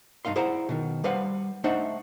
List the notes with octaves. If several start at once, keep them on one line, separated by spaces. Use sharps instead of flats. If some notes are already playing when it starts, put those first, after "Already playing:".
G2 D#4 F5 C6
E4 G#4 C5 D5 F#5 A#5
B2 D#3
G3 B4 C5 F5 F#5
A3 D4 D#4 C5 E5 F#5